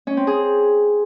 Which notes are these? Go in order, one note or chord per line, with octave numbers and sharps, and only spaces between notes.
C#4
C4
G#4